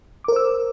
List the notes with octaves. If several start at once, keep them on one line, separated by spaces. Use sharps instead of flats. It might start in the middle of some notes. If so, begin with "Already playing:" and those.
A#4 C5 D6 E6